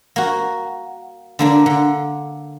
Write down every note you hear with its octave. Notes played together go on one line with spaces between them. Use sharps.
A#3 F#4
D3 A#3 D4
D3